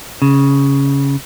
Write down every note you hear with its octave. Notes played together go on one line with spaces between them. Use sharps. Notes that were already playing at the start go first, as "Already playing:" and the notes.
C#3